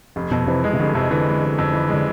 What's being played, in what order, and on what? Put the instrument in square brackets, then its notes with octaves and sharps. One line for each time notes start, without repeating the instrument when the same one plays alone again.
[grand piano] F1
[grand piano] F2 [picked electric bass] B2
[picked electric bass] C3 [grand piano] E3
[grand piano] G#3
[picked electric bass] C3
[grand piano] F1 [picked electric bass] D3
[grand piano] F2 [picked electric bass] C3
[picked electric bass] D3 [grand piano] E3
[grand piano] G#3
F1
F2
E3
[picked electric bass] D3 [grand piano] G#3